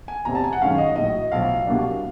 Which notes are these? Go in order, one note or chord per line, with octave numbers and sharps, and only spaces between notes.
G#5
F1 E2 C3 A#5
A5
G#5
F#5
F#2 D#3 G#3 C#4 F5
D#5
A#1 A2 F#3 D#5
B1 A2 F3 F5
C2 B2 F#3 A#3 D4